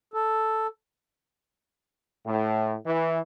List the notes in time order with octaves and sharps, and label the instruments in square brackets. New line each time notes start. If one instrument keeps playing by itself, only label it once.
[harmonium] A4
[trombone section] A2
E3